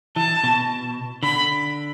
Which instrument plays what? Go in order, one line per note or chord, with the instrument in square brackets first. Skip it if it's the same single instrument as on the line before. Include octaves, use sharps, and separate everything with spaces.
[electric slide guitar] E3 [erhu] A5
[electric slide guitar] B2
[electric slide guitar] D3 [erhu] B5